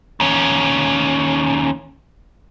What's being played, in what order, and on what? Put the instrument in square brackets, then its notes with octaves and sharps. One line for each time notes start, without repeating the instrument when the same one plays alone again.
[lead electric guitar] D#2 C#4